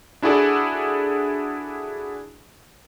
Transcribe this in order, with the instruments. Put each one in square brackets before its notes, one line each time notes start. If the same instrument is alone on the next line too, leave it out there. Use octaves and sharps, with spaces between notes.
[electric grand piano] D4 E4 F#4 G#4 A4 D5